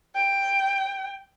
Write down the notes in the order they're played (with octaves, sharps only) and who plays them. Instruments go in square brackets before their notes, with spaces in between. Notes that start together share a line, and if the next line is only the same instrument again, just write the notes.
[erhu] G5